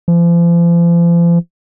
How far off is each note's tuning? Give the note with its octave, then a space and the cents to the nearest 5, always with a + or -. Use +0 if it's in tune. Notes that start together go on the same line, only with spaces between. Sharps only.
F3 -40